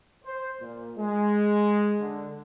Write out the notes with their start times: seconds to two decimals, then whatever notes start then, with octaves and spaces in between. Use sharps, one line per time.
0.25 C5
0.61 A#2
0.99 G#3
2.01 D3